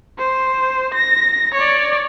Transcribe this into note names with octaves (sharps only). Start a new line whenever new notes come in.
C5
A#6
C#5 D5